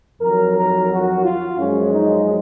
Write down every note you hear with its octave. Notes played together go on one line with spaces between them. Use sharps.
F2 D#3 F#3 A#4
A#4
F#4
F4
F#2 F3 G#3 C#4
D#4